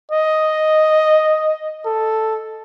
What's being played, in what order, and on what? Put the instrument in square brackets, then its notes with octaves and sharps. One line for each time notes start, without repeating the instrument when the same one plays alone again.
[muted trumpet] D#5
A4